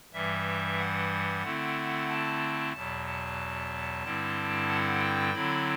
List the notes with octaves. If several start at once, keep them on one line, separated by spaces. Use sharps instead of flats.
G2 E3 G3 E5
F#5
D3 A3 C4 E4
A5
E2 B2 F#3 A5
A5
G2 D3 G3 C4 E4
F#5
G5
D3 F#3 C4 E4 B5